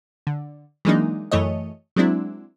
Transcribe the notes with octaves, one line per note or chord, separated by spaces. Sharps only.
D3
E3 F#3 G#3 A#3 D4 D#4
F#2 E3 A3 C#5 D#5
F#3 G#3 C4 D4 E4